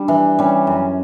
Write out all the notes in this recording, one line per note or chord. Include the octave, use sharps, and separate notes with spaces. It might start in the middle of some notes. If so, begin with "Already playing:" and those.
Already playing: G3 D4
E3
G3 C#4
F#2